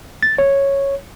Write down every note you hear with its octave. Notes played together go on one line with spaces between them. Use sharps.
A6
C#5